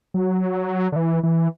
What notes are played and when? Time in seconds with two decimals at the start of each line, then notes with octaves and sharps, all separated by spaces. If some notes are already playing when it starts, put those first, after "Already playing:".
0.14 F#3
0.92 D3
0.96 E3
1.23 E3